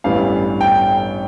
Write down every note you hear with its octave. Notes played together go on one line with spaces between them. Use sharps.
A1 G2 E3 G3 B3 F5
G5